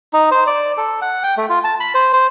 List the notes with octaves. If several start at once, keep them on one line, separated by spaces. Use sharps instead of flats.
D#4
C5
D5
A4
F#5
G5
A3
F4
A5
B5
C5
C5